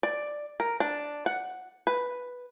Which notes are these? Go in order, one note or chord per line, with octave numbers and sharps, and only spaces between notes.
D5
A#4
D4
F#5
B4